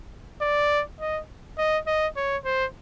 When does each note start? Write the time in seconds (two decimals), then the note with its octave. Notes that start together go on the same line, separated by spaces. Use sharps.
0.41 D5
1.00 D#5
1.58 D#5
1.87 D#5
2.17 C#5
2.45 C5